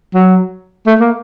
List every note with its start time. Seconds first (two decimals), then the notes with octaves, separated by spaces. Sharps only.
0.14 F#3
0.86 A3
1.00 A#3